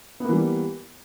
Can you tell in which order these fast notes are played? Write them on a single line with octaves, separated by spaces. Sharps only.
B3 A#3 E3 G3